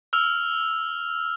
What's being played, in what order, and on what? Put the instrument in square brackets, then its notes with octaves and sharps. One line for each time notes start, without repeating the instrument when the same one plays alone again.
[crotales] E6 F6 F7